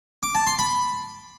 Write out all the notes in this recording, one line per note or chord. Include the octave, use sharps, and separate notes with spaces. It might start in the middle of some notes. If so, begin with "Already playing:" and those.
D6
A5
C6
B5